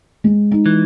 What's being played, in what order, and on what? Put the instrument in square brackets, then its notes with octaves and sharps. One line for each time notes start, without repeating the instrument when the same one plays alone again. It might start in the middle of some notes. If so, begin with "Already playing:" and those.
[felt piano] G#3
D#4
[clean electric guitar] E3